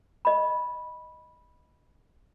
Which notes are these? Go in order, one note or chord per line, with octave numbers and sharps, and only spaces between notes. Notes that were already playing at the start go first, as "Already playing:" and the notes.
D#5 B5